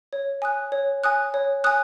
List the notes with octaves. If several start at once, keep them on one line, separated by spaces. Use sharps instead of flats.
C#5
G#5 D#6 F#6
C#5
G#5 D#6 F#6
C#5
G#5 D#6 F#6